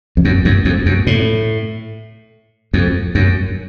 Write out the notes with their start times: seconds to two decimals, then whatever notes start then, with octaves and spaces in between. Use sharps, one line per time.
0.17 F2
0.25 F#2
0.45 F#2
0.65 F2
0.86 F#2
1.07 A2
2.74 F2
3.15 F#2